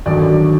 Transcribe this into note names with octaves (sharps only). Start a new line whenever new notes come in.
D#2 D3 F#3 D5